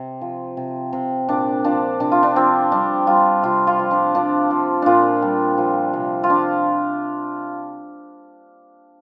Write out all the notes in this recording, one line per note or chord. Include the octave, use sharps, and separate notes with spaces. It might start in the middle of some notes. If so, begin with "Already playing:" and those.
Already playing: C3
F3
C3
C3
A#2 D4
F3 D4
C3 D4
F4
D4
F3 C4
G3 D4
G3 F4
C3 F4
F4
F3
D4
F3 D4
F3
A#2 D4 F4
G3
F3
C3
F4
F3 D4